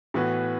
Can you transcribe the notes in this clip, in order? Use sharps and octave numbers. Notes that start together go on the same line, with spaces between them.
A2 E3 B3 F#4